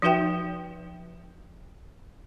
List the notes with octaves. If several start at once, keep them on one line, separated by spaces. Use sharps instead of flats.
F3 D#4 F#4 B4 E5 G5